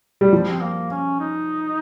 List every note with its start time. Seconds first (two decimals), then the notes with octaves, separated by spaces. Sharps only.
0.21 G3
0.33 F3 G3
0.50 C4
0.61 A#3
0.91 C#4
1.20 D#4